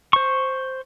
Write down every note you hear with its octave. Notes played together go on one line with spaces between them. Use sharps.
C5 C#6